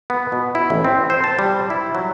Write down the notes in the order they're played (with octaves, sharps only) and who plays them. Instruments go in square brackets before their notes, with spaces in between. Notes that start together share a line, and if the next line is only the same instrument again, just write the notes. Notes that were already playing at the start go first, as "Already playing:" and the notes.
[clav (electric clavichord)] B3
B2
E4
A1
C4
C5
A5
G3
E4
F#3